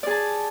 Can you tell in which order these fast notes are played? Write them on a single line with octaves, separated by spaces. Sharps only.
D5 G#4 A5